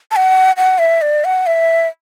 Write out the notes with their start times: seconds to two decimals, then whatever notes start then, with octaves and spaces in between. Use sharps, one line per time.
0.11 A5
0.16 F#5
0.57 F#5
0.79 E5
1.02 D5
1.25 F#5
1.46 E5